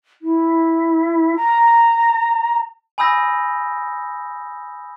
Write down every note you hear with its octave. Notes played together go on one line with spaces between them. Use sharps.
E4
A#5
G#5 B5 D#6 E6 G6 A#6